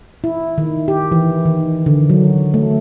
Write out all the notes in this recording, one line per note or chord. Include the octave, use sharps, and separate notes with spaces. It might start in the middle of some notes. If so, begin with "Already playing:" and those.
E4
D#3
G4
E3
D#3
D3
F#3
A3